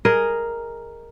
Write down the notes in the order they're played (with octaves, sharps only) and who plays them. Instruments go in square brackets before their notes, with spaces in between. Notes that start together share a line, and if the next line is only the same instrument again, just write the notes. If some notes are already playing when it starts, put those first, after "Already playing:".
[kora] G#4 A#4 D#5